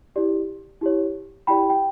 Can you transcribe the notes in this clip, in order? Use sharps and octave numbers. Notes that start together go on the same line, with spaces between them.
E4 G4 D5
E4 G4 C#5
E4 G4 D5 G5 B5
G5